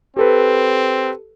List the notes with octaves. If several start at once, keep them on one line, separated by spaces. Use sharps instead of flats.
C4 G4 A4 B4